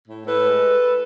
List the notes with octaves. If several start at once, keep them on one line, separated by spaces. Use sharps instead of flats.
A2
A2 A4 B4
G#3